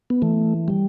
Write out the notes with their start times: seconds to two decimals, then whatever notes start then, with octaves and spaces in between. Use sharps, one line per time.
0.10 B3
0.22 E3 A3
0.68 G3